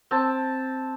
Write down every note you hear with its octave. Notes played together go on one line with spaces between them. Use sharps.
C4 A5